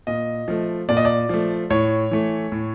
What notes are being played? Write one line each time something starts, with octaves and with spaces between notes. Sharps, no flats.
A#2 D#5
F3 A3
A#2 D5
D#5
D5
F3 A3
A2 C#5
E3 A3
A2